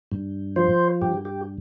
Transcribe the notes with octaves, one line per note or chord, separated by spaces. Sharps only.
G2
F3 C5
G2 G4
G4